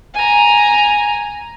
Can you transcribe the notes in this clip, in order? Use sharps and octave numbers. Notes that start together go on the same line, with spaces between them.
G#5 A#5